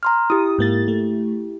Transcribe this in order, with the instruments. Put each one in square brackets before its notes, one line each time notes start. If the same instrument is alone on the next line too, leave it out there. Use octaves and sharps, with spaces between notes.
[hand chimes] A#5 C6 F6
[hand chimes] E4 G4 [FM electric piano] D#6
[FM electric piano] G#2 A#3 A6
A3